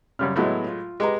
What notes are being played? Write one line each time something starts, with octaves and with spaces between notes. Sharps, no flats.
F#2 C#3 G3 F6
A2 F#3 G#3 B3 E4 A4
F4
G#3 G4 B4 A#5